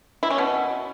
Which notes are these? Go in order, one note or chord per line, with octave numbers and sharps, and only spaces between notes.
E4
C#4
B2